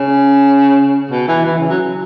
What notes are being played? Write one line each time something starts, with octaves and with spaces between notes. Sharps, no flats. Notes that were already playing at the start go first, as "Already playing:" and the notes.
Already playing: C#3
B2
E3
E3
C#3
F#3